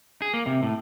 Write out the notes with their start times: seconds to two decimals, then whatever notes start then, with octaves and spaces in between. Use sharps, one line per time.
0.22 G#4
0.34 A#3
0.46 C3
0.63 A2